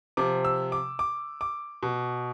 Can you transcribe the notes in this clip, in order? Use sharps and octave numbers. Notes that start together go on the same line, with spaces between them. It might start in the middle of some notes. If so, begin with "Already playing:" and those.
C3 F3 D6
E6
D6
D6
D6
B2